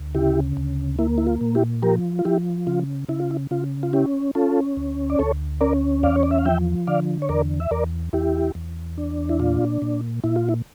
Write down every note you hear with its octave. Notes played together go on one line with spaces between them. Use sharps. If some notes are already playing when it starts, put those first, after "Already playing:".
Already playing: D2
C#3 E4 G4
D2
A#3 E4
E4
F4
A#2
E4 G4
F3 G4 A#4
F4
F3 E4 G4
C#3 F4
C#3 E4
F4
E4
C#3 F4
F4
C#4 E4 G4
C#4 F4 A4
D2
D5
D2 A4 C#5
C#4 A#4 D5
E2 D5 F5
C#5
D5
E5
F5
F3 E5 G5
D3 D5 F5
C#5
E2 A#4 D5
E5
E2 A#4 D5
E2 E4 G4
E2
D4
E4
A#2 F4
A#2
A#2 E4
F4
E4